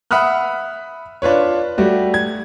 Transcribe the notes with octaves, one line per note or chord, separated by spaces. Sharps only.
E5 F#5 B5 D#6 F6 F#6
D4 F4 B4 C#5
G3 A3 F#4
G#6